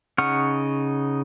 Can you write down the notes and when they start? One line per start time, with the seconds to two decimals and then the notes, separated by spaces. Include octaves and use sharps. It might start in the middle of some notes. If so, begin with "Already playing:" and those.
0.18 C#3 D#4 F#5 C#6 F6